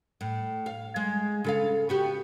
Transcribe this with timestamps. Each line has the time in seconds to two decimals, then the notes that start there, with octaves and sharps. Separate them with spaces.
0.21 A2
0.66 F5
0.96 G#3
1.44 C#3 A4 F5
1.89 B3 F#4 G4